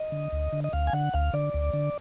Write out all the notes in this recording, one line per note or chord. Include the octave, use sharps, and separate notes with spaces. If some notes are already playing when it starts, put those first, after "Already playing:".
Already playing: D#5
D3
D2
D3
D#5
D2 F5
G#5
D3 F#5
D2 F5
D3 D5
D2
D3